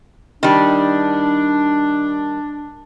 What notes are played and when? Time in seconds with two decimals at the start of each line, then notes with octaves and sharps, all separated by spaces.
0.43 D#3 G3 D4